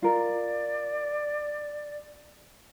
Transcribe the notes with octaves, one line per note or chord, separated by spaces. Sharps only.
F4 A#4 D5